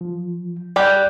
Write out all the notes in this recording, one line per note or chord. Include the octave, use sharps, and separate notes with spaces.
F3
G3 G4 D5 F#6 G6